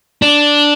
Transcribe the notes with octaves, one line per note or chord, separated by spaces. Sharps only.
D4